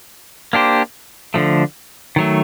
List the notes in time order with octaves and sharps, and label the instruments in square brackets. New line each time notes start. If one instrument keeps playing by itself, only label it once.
[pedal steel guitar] A#3 D4 G4 C5
D3 F3 A3
D#3 F#3 A3